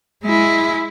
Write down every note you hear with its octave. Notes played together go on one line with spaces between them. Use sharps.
G#3 E4